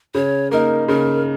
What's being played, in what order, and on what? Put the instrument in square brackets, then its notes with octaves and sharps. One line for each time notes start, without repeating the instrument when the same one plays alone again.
[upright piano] C#3 [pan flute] C#5
[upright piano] A#3 D#4 [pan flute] A#4
[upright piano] C#3 [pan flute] A#4